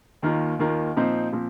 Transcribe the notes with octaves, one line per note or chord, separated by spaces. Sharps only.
D#2 D#3 A#3 F4
D#2 D#3 A#3 F4
A#2 F3 C4 D#4 C5
A#2 F3 C4